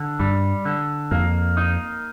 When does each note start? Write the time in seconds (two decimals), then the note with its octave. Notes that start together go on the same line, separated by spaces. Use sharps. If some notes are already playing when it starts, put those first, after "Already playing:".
Already playing: D3
0.19 G2 G3
0.65 D3
1.11 F2 A#3
1.57 D#4